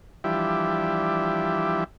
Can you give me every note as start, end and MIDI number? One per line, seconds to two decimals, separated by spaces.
0.24 1.84 52
0.24 1.84 53
0.24 1.84 55
0.24 1.84 62
0.24 1.84 64
0.24 1.84 67